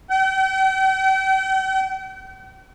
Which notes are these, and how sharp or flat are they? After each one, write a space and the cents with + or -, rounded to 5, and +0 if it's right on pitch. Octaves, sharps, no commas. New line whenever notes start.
G5 -45